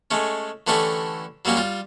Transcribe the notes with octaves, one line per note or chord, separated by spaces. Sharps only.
G#3 A3 C#4
D3 E3 A3 C#4 E4 G4
F#3 G3 A#3 C#4 G4
G3 F4